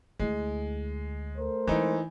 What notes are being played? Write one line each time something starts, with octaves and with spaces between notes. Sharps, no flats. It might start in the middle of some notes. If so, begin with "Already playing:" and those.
D2 G#3 E4
A3 A#4 C5
E3 G#3 C4 D#4